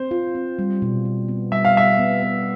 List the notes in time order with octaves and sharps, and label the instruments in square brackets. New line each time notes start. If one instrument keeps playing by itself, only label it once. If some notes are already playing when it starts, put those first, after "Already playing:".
Already playing: [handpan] C4 [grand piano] C5
[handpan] F4
C4
G3
B2
B2
B3
[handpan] G3 [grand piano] E5
[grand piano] F5
[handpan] G3 [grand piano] E5
[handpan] B3
B3